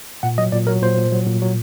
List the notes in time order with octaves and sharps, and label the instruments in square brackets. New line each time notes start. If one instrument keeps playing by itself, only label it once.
[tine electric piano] A#2 F#5
F#3 D#5
A#2 D5
F#3 A#4
A#2 C5
A#2
F#3
A#2
F#3